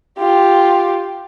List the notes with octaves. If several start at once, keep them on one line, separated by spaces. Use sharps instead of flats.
F4 G4